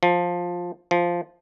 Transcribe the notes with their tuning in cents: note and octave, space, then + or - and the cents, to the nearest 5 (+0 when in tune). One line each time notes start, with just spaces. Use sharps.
F3 +10
F3 -5